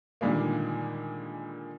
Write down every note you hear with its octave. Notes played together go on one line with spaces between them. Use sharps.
A#2 D3 D#3 G3 G#3 A#3